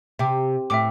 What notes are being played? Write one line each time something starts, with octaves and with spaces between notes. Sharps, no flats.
C3 E5 G5 D6
A2 E5 G5 D6